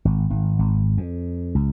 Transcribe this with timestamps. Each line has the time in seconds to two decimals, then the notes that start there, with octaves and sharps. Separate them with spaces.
0.05 G#1
0.30 G#1
0.59 G#1
0.97 F2
1.55 C#2